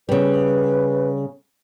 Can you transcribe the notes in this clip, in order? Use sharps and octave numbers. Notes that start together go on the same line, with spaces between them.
C#3 G3 B4